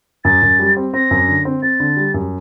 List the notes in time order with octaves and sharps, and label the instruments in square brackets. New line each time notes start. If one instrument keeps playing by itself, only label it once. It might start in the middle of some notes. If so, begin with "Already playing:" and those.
[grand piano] F#2 [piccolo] A6
[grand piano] F#2
G3
C4
[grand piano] C4 [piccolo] A#6
[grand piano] F#2
D3
C4
[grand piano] C4 [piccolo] A6
[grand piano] D3
G3
F#2